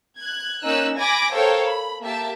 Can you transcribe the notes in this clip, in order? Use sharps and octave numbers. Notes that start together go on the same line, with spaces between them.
F#6 G#6
A#3 C#4 D#4 E6 F#6
G#5 B5 D6 G#6 A#6
A4 A#4 C5 C#5 F5 G5
B5
A#3 G4 E5 A5